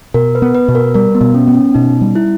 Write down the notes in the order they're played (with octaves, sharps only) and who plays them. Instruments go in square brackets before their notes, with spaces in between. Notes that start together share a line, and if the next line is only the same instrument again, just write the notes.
[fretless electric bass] B2 [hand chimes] A#4
[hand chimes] B4
[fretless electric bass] B3
[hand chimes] B4
[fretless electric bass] B2
[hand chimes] A#4
[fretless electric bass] G3 [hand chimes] A#4
[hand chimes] B3
[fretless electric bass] B2
[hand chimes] C#4
[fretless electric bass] B3
[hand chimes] C#4
[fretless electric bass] B2 [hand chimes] D#4
[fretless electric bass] G3
[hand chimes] E4